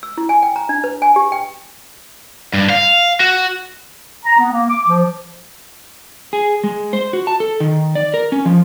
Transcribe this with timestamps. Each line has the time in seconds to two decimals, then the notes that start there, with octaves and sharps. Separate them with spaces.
0.03 E6
0.18 E4
0.29 G#5
0.43 G5
0.56 A#5
0.69 D4
0.84 B4
1.02 G#5
1.16 G4
1.32 G5
2.54 G2
2.70 F5
3.20 F#4
4.26 A#5
4.38 B3
4.52 A#3
4.69 D6
4.88 F3
6.33 G#4
6.64 G#3
6.93 C5
7.13 F#4
7.27 A5
7.40 A4
7.60 D#3
7.95 D5
8.14 A#4
8.32 C#4
8.45 F3